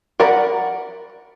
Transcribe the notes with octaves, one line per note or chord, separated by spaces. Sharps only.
A#4 D5 F#5 A#5 B5